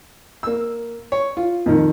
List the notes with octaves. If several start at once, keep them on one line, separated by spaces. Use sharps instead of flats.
A#3 E6
C#5
F4
F2 D#3